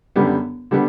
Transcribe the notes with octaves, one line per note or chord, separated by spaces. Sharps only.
F#2 D3 G3 B3
D3 G3 B3